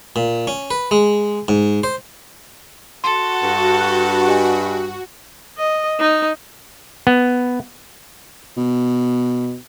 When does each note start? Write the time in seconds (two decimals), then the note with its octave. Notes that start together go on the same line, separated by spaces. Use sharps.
0.16 A#2
0.47 C#4
0.71 B4
0.91 G#3
1.48 G#2
1.84 C5
3.04 F#4 A4 C6
3.43 G2
3.81 F#6
4.27 G4 D#5 G#5
5.58 D#5
6.00 D#4
7.07 B3
8.57 B2